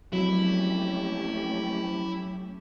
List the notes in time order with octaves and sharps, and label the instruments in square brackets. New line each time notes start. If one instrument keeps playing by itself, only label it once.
[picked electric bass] F3 G#3 C4 [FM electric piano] F#3 [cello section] A3 C#4 G4 [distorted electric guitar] E4